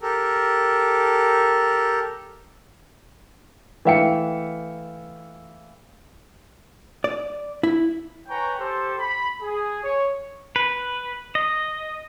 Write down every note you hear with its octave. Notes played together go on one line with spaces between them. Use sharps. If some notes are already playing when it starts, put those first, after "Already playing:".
G4 A4 A#4
E3 A3 E5 F5 G5 C#7
D5
E4
B4 C#5 G5 G#5 A#5 C#6
G4 A4 C5
B5
G#4
C#5
B4
D#5